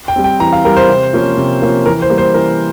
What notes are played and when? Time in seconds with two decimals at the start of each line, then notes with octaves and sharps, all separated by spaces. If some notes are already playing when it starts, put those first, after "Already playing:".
0.08 G5
0.16 G3 C4
0.24 G5
0.40 E3 A#5
0.53 F5
0.65 G3 C4 A#4
0.76 C5
0.89 C3
1.13 F3 A#3 C#4
1.38 C3
1.62 F3 A#3 C#4
1.86 E3 A#4
2.02 C5
2.10 G3 A#3
2.18 C5
2.34 E3 A#4